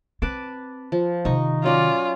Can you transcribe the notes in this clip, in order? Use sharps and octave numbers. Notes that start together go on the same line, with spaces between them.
C4 B4 A5 D6
F3
C3 D#3 D#4 C#6
F#3 C#4 F4 D5